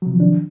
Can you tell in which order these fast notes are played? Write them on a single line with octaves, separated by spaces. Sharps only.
F#3 C3 F3 D#3 D4